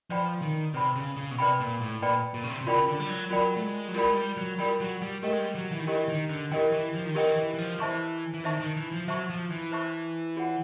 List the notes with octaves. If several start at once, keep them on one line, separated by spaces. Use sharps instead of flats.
F3 B4 D5 G5 B5
D#3
C3 B4 D5 G5 B5
C#3
C#3
B2
C3 B4 D5 G5 B5
A#2
A2
A#2 B4 D5 G5 B5
A#2
C#3
C3
C3
C#3 F4 A#4 D5 G5 B5
D3
G3
F#3
F#3 F4 A#4 D5 G5 B5
A3
G#3
F#3
G3 F4 A#4 D5 G5 B5
G#3
G3
F#3
G3 F4 A#4 D5 G5 B5
F#3
G3
A3 G4 A#4 D#5 G5
G#3
G3
F#3
E3
D#3
E3 G4 A#4 D#5 G5
D#3
D3
E3 G4 A#4 D#5 G5
E3
F3
D#3
E3 G4 A#4 D#5 G5
E3
E3
F3
E3 C5 E5 A5 C#6
E3
D#3 C5 E5 A5 C#6
D#3
E3
F3
F#3 C5 E5 A5 C#6
F3
E3
C5 E5 A5 C#6
F4 G#4 C#5 F#5